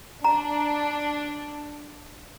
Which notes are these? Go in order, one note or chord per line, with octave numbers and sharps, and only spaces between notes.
D4 A#5